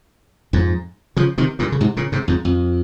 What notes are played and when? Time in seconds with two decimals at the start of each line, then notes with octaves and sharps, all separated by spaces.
0.53 F2 G#2
1.17 C#3 F3
1.38 C3 D#3
1.59 G2 A#2
1.72 C#3
1.81 G#2 C3
1.97 A#2 C#3
2.12 G#2 C3
2.28 F2 G#2
2.45 F2